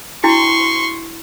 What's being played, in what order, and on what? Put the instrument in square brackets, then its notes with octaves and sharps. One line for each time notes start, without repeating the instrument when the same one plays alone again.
[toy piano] D4 E4 F#4 [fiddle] C6 C#6